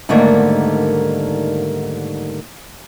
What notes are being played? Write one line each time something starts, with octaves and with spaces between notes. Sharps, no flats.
G#2 D3 D#3 G3 A3 A#3